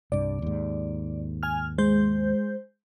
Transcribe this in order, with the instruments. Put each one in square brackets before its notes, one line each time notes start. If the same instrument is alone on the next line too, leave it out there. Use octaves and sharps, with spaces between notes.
[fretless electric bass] C2 G2 [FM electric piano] D5
[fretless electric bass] D#2 G#2
[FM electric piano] G#5 F6
G#3 C5 G6